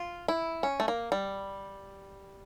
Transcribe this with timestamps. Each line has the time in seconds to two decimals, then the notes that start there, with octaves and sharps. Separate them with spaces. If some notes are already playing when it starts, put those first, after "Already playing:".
Already playing: F4
0.28 E4
0.63 C#4
0.80 A3
0.88 A#3
1.12 G3